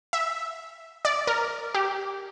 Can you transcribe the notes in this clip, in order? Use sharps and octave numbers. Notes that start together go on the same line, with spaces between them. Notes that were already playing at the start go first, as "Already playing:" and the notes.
E5
D5
A#4
G4